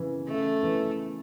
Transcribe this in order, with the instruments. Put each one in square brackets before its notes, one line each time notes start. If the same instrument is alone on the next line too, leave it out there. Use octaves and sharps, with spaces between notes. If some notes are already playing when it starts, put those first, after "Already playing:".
Already playing: [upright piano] C#3 E3
[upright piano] C#3 [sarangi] A3
[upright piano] E3